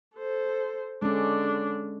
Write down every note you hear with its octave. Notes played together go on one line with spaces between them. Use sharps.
A4 C5
D3 G#3 C#4 D4